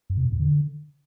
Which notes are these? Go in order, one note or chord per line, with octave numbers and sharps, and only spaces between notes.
F#2
C3
A#2
F2
D3